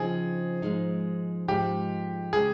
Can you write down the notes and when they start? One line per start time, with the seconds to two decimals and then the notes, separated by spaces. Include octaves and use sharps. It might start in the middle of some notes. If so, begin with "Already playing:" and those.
Already playing: C#3 F3 C4 D#4 G#4
0.62 G#2 F3 G#3 D#4
1.48 G#2 F3 G#3 D#4 G4
2.33 C#3 G#3 G#4